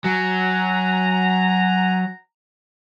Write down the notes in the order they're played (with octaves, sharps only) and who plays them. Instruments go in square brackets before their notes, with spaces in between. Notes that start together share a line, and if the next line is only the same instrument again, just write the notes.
[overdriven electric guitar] F#3 [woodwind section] F#5 G#5 A#5